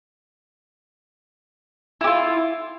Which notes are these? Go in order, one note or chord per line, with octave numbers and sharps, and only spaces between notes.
E4 F4 G4